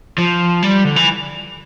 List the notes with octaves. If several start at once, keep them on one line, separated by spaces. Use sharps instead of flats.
F3
G3
D3
E3